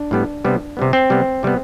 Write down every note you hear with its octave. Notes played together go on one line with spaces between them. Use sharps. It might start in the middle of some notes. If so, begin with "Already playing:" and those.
Already playing: D4
A2 G3 B3
C3 G3 B3
C3 G3 B3
C4
C3 G3 B3
C3 G3 B3